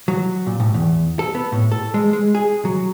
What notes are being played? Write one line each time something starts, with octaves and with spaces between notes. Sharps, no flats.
F#3
A#2
A2
E2
A4
B3
A2
A4
G#3
G#3
G#4
F#3